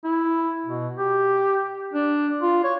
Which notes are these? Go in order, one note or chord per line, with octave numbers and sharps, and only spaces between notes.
E4
B2
G4
D4
F4
C#5